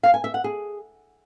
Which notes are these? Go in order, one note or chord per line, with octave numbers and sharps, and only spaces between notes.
F5
G#5
E5
F#5
G#4